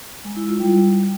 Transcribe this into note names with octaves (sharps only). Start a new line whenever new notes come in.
G#3
E4
F4
G3